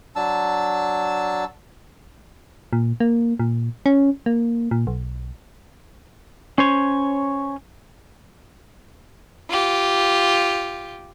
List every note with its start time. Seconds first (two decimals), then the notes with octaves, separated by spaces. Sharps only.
0.16 F#3 D4 A5 E6
2.73 A#2
3.00 A#3
3.39 A#2
3.86 C#4
4.26 A#3
4.71 A#2
4.87 B1
6.58 C#4 C5 C#5
9.49 F4 G4